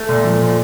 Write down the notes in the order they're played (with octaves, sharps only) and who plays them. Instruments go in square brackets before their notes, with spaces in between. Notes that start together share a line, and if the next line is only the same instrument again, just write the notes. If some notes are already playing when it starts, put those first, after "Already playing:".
Already playing: [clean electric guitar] A3
[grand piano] A#2
F3
A#2